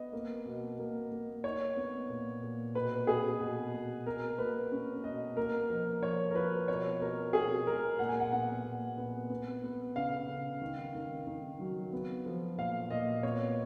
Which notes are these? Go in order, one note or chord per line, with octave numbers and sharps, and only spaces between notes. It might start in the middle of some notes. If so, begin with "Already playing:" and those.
Already playing: B3 D#5
A#3
B2
A#3
A#3
D#4 C#5
B3
A#2
A#2
B2 B4
B2 G#4
B2
B2
B2 A#4
A#3 B4
C#4
B2 D#5
A#3 A#4
F3 A#4
F3 C#5
A#4
F3 B4
B2 C#5
B2 A#4
B2 G#4
G#3 A#4
A#2 F#5
G#5
F#5
B3 F#5
A#2
B3
B3
B3
C#3 F5
C#3
D#3
D#3
D#3
F#3
B3
F3
A#2 F5
A#2 D#5
B3 C#5